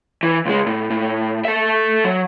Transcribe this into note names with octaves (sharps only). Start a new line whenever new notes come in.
E3
C#2 G#3
A2
A2
A4 E5
F#3